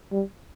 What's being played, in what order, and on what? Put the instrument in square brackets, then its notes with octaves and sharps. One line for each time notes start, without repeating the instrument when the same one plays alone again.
[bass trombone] G3